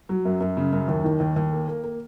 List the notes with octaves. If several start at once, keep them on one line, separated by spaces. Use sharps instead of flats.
F#3
F#2
F#2
C#3
F#2
D#2
D#3
D#2
D#2
A#3
A#3
A#3